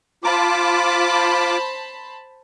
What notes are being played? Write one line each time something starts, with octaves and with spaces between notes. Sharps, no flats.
F4 C5 A5 B5 D6